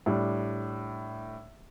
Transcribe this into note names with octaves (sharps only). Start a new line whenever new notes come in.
A2 G3 D4